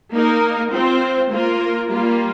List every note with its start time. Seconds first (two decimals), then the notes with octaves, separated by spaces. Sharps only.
0.12 A#3 D#4 A#4
0.71 C4 F4 C5
1.31 A#3 F4 A#4
1.90 G3 A#3 F4